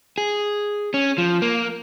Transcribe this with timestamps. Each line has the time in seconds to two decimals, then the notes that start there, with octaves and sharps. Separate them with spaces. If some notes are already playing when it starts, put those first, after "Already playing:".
0.18 G#4
0.94 C#4
1.18 F3
1.42 A#3